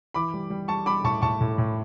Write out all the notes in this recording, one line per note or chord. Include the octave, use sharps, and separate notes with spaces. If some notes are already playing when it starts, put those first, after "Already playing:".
E3 B5 D6
G3
G3
G3 A5 C#6
G3 B5 D6
A2 A5 C#6
A2 A5 C#6
A2
A2